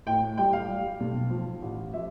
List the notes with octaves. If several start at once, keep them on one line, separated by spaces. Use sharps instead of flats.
A2 G5
G3 G5
F5
G3
B1
F3
A1
F3 E5